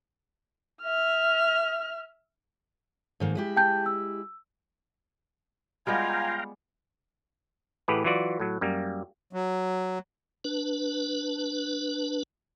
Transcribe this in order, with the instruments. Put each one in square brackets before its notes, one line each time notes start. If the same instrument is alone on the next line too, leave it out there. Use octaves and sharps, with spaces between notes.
[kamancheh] E5 F6
[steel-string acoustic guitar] G#2 D#3 A#3
G#3 E4 G4
[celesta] G5 A5 G6
E6
[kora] G3 G#3 B3 [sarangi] F4 [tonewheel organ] F5 G5 A#5 [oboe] G#5
[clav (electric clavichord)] A2 E3 G4 G#4 B4 F#5
E3 F#3 F4 F#4 D5
A2 F#3
F#2 G3 A#3
[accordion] F#3
[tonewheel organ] D4 B4